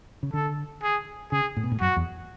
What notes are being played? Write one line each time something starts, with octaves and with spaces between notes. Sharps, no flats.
C#3
D3 A4
G#4
C#3 G#4
A2
B2
A2
F#2 F#4
E2